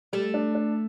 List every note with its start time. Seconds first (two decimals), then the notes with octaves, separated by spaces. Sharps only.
0.13 G3 A3
0.34 D4
0.55 D4